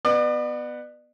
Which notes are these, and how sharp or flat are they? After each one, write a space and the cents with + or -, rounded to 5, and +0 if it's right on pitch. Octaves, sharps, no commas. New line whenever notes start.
B3 +0 D5 +40